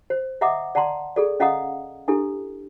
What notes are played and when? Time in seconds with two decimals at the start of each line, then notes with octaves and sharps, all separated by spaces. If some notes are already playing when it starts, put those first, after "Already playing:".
0.10 C5
0.41 D#5 E5 F#5 A#5 D6 D#6
0.75 D5 F#5 A5 A#5 C6
1.16 G#4 A4 D5
1.40 C#4 D#5 F5 F#5 A#5 D#6
2.08 D4 E4 G4 A4